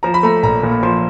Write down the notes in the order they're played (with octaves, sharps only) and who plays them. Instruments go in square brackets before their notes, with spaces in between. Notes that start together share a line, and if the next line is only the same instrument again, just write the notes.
[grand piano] F3 A#5
B5
A3 A#5
A#1 A#5
A#2
F3 C6